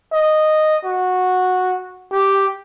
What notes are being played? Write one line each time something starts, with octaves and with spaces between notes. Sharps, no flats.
D#5
F#4
G4